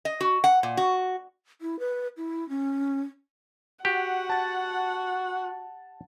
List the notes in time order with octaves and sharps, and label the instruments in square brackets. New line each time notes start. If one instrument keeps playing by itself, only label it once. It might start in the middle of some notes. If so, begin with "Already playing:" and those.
[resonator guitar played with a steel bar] D#5
F#4
F#5
A#2
F#4
[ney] E4
B4
E4
C#4
[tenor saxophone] F#4 [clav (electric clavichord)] G4 [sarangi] F#5
[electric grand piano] A5 A6